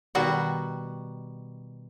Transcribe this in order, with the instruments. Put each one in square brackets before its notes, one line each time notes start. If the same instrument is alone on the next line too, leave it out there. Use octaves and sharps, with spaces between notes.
[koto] B2 D#3 G3 F#4 F#5